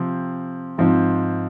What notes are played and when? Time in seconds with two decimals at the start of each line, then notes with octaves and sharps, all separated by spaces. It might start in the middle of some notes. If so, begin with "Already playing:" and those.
Already playing: C3 F3 C4
0.78 G#2 F3 C4